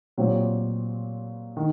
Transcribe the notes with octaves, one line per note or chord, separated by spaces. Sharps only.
A#2 F#3 C4 G4
D#3